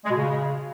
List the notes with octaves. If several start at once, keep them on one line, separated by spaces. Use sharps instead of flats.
G#3
B2
C#3